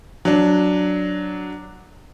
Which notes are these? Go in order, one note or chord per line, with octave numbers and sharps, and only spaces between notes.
F#3 D4